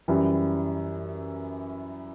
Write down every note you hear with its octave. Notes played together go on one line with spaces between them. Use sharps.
F#2 E3 G3